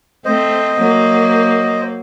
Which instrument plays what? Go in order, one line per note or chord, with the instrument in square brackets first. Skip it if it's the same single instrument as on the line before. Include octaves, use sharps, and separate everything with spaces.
[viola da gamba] A3 C4 [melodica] C5 D#5
[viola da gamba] F#3 A#3